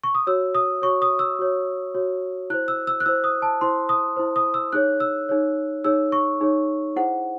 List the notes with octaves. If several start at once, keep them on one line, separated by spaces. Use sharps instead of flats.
C#6
D#6
F#4 C#5 E6
D#6
F#4 C#5 C#6
D#6
E6
F#4 C#5
F#4 C#5
E4 C5 F#6
E6
E6
F#6
E4 C5 E6
D#6
A5
E4 C5 C6
D#6
E4 C5
D#6
E6
D#4 G#4 C#5 F#6
E6
D#4 G#4 C#5
D#4 G#4 C#5 E6
C#6
D#4 G#4 C#5
E4 G#4 C5 F#5